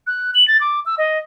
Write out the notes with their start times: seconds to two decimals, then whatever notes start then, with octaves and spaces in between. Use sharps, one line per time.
0.07 F#6
0.35 F#7
0.48 A6
0.61 D6
0.86 E6
0.98 D#5